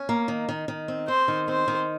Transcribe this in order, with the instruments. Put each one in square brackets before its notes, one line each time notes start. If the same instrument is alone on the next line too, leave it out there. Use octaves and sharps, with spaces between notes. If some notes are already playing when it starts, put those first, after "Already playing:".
Already playing: [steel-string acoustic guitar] C#4
A#3
D#3
D#3
D#3
C4
[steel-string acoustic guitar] C4 [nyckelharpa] C5
[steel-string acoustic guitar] D#3
[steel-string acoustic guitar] C4 [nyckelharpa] C5
[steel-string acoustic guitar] D#3